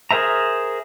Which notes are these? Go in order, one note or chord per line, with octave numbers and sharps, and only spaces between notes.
G#4 A#4 C5 E5 A#5